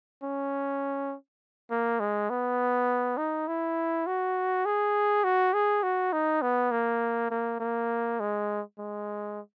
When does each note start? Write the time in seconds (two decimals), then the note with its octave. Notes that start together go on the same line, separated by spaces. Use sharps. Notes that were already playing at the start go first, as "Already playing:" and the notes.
0.23 C#4
1.71 A#3
2.00 G#3
2.30 B3
3.18 D#4
3.47 E4
4.07 F#4
4.66 G#4
5.24 F#4
5.54 G#4
5.83 F#4
6.12 D#4
6.42 B3
6.71 A#3
7.31 A#3
7.60 A#3
8.20 G#3
8.79 G#3